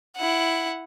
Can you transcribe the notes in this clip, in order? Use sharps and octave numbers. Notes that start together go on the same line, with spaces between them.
E4 F#5